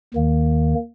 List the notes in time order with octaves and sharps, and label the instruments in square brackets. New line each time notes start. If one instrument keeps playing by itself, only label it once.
[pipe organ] D#2 D#3 A#3